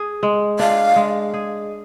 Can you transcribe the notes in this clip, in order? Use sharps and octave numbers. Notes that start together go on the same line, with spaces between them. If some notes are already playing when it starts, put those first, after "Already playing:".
Already playing: G#4
G#3
D4 F5
G#3
G#4